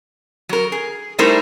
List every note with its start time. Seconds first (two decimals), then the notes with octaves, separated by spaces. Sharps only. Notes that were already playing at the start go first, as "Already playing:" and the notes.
0.49 F#3 A#4
0.72 G#4
1.18 G3 A3 D#4 E4 A#4 C5